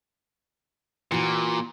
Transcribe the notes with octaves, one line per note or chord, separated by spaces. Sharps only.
A#2 E3 F#4 G4